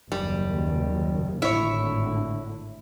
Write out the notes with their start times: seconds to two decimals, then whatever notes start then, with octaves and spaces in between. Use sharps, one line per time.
0.12 F#1 D#2 G3
1.42 G#1 A2 D3 E4 C#5 E5